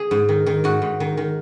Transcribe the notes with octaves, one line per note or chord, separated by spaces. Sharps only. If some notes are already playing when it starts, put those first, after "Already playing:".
Already playing: G#4
G#2
D#3
D#3
G#2 F#4
G#2
D#3
D#3